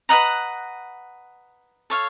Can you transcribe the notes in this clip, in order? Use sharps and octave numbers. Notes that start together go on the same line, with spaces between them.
B4 D#5 F#5 A#5
A4 C#5 F5